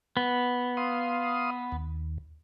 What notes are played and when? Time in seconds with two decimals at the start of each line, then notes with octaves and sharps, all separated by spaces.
0.17 B3
0.77 F5 C6 D#6
1.72 D#2